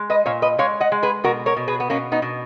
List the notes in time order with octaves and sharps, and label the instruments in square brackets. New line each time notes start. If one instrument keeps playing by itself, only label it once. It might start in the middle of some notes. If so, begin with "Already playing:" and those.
Already playing: [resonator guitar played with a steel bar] G#3
B4 D#5
A#2 C#5 F5
B4 D#5
G#3 C#5 F5
D#5 F#5
G#3
G#4 B4
B2 F#4 A#4
A#4 C#5
B2
G#4 B4
B3
B2 A#3 C#4
B3 D#4
B2